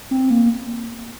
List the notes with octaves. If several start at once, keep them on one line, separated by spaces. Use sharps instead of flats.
C4
A#3